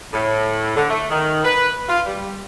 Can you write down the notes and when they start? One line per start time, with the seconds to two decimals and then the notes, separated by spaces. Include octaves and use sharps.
0.13 A2
0.77 D3
0.90 A3
1.11 D#3
1.44 B4
1.88 F4
2.06 G3